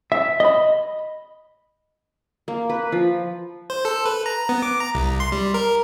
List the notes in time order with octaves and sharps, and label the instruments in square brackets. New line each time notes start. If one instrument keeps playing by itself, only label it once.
[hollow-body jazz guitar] E5
D#5 B5
[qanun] A#3
B4
F3
[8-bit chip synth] C5
A4
B4
A#5
B3
D6
A#5
C2
C6
G3
A#4